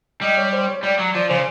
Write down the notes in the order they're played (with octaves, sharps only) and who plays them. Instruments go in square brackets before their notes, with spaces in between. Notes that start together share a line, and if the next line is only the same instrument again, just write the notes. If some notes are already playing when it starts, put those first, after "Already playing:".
[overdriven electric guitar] G3 [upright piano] D#5
[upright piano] C#5
C5
C#5
[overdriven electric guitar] G3 [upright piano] D5
[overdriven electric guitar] F#3
[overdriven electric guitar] F3 [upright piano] D5
[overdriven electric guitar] C#3 [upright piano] C5